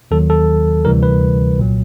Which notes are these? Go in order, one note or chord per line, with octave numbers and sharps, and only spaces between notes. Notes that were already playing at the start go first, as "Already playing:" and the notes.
D#2 D#3 F#3 A4
A4
D2 C3 E3 G3 A#4
B4
C2 A#2 F#3